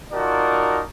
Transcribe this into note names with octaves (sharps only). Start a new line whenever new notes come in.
D#4 F4 F#4 A#4 D5 A5